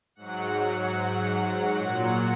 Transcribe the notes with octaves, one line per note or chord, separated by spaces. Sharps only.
G#2 F#3 F#5
A#2 F#3 F#5